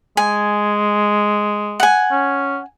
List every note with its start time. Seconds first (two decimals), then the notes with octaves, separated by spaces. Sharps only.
0.17 G#3 G#5
1.80 F#5 G#5
2.11 C#4